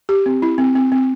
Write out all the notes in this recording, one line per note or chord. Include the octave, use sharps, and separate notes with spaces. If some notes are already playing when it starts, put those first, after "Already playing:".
G4
C4
E4
C4
C4
C4